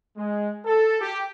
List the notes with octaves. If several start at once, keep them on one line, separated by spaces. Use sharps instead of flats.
G#3
A4
G4